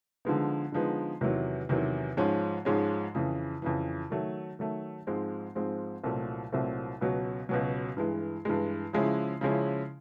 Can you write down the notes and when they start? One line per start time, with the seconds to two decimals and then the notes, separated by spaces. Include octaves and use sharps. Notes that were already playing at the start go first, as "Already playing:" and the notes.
0.25 D3 F3 G#3 B3 D#4
0.72 D3 F3 G#3 B3 D#4
1.21 E2 C3 D#3 F#3
1.69 E2 C3 D#3 F#3
2.17 G#2 F3 G#3 C#4
2.65 G#2 F3 G#3 C#4
3.15 F2 C#3 E3
3.62 F2 C#3 E3
4.10 D#3 F#3 A3
4.59 D#3 F#3 A3
5.07 G#2 F3 G#3 C4
5.55 G#2 F3 G#3 C4
6.04 C2 A#2 F#3 A3 C4
6.52 C2 A#2 F#3 A3 C4
7.01 C#2 B2 F#3
7.49 C#2 B2 F#3
7.97 G2 E3 G#3
8.45 G2 E3 G#3
8.93 C#3 F3 G#3 C#4 E4
9.41 C#3 F3 G#3 C#4 E4